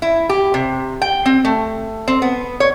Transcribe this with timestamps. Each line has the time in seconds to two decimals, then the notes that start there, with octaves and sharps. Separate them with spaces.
0.02 E4
0.29 G4
0.54 C3
1.02 G5
1.26 C4
1.45 A3
2.08 C4
2.22 B3
2.60 C#5